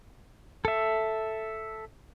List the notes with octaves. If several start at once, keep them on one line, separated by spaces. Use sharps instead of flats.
A4 E5